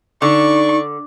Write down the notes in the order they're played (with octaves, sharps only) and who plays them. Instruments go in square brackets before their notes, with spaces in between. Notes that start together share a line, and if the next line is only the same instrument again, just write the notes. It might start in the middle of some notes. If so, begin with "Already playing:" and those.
[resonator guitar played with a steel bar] D3 [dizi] D#4 [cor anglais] D5 [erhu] C#6